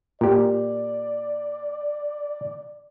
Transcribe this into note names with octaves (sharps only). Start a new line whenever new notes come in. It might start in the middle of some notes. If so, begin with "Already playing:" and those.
A#2 G4 D5